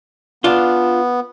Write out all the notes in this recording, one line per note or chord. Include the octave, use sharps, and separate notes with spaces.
B3 D4 F4